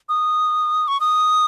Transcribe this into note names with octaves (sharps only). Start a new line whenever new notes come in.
D#6
C#6
D#6